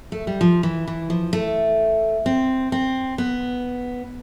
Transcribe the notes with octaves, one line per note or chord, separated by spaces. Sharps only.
A3
G3
F3
E3
E3
F3
A3
C4
C4
B3